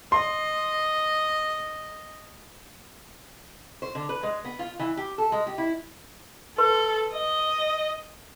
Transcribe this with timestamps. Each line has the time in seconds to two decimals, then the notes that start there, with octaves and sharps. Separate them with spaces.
0.12 D#5 C6
3.82 C5
3.95 D3
4.09 B4
4.23 G#3
4.45 B3
4.59 F4
4.79 E3
4.97 G4
5.18 A4
5.32 G#3
5.47 G4
5.58 E4
6.58 A4 B4 C6
7.13 D#5